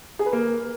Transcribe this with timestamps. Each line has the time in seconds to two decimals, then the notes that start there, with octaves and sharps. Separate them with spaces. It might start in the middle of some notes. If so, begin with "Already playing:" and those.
0.19 G#4
0.26 B4
0.33 A#3